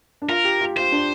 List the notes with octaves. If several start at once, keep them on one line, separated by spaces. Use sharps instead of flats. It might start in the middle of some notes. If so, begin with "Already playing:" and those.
D4
F4 A#4
G4
F4
F4 C5
D4